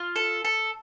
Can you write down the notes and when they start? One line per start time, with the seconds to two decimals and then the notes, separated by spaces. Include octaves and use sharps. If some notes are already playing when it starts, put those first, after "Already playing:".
Already playing: F4
0.16 A4
0.44 A4